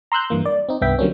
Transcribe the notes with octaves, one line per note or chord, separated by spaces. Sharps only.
A#5 C6 E6 F#6 G6
G2 E3 A#3
D5
C4 D#4
C2 G2 B3 E5 G5 B6
D3 F#3 G3 A#3 C4 C#4